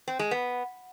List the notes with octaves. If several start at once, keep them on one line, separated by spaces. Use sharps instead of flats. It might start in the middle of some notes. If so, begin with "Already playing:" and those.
C4
G#3
B3